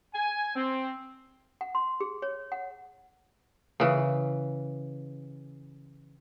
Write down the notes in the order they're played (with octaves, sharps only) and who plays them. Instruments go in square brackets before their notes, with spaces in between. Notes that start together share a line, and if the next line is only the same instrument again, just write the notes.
[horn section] G#5
C4
[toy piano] F#5
C6
G#4
C#5
F#5
[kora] C#3 E3